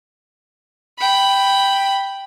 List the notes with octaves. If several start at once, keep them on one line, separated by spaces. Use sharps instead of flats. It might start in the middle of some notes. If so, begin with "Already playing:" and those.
G5 B5